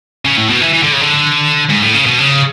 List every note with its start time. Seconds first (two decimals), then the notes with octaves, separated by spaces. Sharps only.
0.25 C#3
0.37 A2
0.49 B2
0.61 E3
0.73 E3
0.83 D3
0.92 C#3
1.01 D3
1.70 G#2
1.82 A2
1.94 C#3
2.06 B2
2.18 C#3